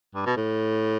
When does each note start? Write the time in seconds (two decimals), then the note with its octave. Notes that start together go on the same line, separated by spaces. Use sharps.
0.15 G2
0.26 B2
0.36 A2